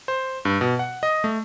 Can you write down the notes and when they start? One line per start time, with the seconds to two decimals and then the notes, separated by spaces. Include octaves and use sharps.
0.08 C5
0.45 G2
0.61 B2
0.79 F#5
1.03 D#5
1.24 A3